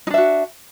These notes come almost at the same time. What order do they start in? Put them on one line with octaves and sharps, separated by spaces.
D#4 D4 E5 F#4